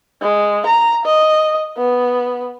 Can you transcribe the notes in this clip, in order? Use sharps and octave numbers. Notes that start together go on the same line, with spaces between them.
G#3
A#5
D#5
B3